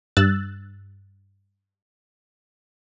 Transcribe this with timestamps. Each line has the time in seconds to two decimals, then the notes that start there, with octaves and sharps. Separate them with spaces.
0.17 G2 E6 F#6 A6